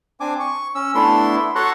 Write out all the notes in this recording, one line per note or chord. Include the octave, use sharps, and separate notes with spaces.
C4 D4 G#5 D6
C#6
C#4 E6
A3 B3 D4 E4 C6
F#4 A4 C#5 A#5 C6 F#6